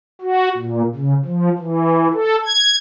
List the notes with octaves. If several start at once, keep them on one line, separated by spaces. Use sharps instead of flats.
F#4
A#2
C#3
F3
E3
A4
G#6